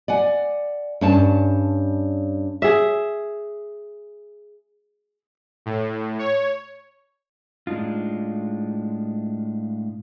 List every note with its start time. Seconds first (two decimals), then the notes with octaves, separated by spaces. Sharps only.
0.08 D5 F#5 G#5
1.01 G2 C#4 A5
2.62 G#4 E5
5.66 A2
6.19 C#5
7.67 A2 G#3 D4 D#4 F4